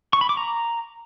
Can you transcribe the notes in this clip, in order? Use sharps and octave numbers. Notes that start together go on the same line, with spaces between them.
C#6
B5
D6
A#5